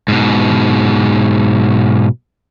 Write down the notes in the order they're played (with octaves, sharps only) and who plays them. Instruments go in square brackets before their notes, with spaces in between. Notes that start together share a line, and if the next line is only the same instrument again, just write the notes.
[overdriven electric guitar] G#2 B2